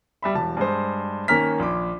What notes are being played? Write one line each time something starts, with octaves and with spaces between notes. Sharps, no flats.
G3 E5 B5
E1 A5
G2 G#3 C5
D#3 A#3 C#4 A#5 F6 B6
A#1 C6 D6